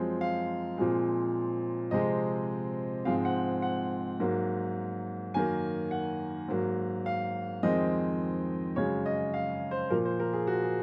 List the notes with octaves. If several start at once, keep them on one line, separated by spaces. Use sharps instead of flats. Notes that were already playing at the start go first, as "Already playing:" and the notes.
Already playing: F#2 F3 G#3 C4
F5
A#2 F3 G#3 C4
C3 F3 G#3 C4 D#5
G#2 F3 G#3 C4 F5
F#5
F#5
G#2 F#3 A#3
F#2 D#3 A#3 G#5
F#5
G#2 F#3 A#3
F5
F2 D#3 G#3 C4 D#5
F#2 C#3 G#3 C#5
D#5
F5
C5
A#2 F3 A#3 A#4
C5
A#4
G#4
F#4
G#4